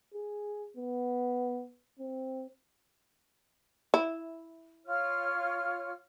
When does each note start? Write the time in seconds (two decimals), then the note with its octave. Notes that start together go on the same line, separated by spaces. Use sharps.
0.14 G#4
0.77 B3
1.99 C4
3.94 E4
4.86 F4 C#5 F6